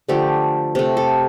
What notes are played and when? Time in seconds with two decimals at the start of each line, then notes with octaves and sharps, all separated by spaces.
0.08 D3 F3 A3 G4
0.75 C3 A3 G4
0.97 A4